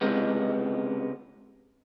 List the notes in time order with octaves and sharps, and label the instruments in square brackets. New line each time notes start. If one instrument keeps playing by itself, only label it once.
[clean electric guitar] C#2 C3 G#3 B3